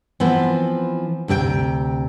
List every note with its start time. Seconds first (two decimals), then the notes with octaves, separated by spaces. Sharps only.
0.20 E3 F3 B3 C4
1.28 D2 C3 G#4 G5